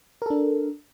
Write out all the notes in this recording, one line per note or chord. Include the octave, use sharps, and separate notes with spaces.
D4 A4 A#4